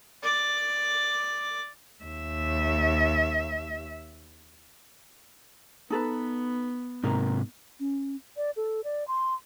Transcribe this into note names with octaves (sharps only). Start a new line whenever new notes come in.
D5 D6
D#2 E5
B3 D#4 A4 B4
G#2 C3 D#4 A#4
C#4
D5
A4
D5
C6